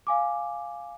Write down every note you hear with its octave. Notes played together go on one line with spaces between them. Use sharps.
F5 G#5 D6